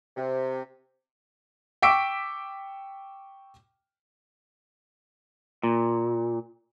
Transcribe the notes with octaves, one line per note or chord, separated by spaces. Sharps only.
C3
G5 C#6 D6 E6 B6 D7
A#2